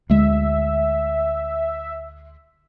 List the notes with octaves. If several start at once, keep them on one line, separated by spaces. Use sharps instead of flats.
D2 G#3 E5